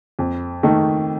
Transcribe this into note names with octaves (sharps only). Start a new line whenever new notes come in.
F2
D#3 A3 D#4